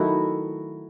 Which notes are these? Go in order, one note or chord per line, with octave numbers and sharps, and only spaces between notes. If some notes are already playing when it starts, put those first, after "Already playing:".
Already playing: D#3 F#3 A3 D#4 E4 F#4